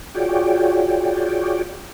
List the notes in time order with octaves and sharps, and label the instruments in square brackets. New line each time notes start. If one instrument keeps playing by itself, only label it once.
[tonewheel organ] F4 F#4 G#4 C#5 D5 G5